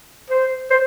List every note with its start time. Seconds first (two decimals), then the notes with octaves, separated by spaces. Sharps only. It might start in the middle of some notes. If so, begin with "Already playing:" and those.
0.30 C5
0.71 C5